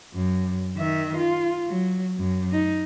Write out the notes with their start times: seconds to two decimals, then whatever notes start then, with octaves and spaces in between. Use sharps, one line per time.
0.14 F#2
0.77 D#3 E5
1.17 F4
1.67 F#3
2.18 F#2
2.52 D#4